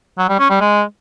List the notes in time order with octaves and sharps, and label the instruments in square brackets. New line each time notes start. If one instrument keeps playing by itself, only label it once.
[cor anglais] F#3
G3
C#4
G3
G#3